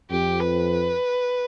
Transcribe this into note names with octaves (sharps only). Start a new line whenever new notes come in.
F2 G4
B4